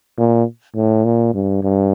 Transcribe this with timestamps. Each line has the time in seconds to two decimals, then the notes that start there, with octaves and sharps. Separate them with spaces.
0.18 A#2
0.76 A2
1.05 A#2
1.34 G2
1.63 G2